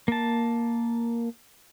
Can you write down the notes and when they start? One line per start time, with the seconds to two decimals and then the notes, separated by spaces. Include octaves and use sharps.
0.08 A#3 A5